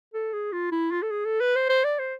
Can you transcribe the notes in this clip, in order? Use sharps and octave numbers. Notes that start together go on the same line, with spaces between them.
A4
G#4
F4
E4
F4
A4
G#4
A4
B4
C5
C5
D5
C5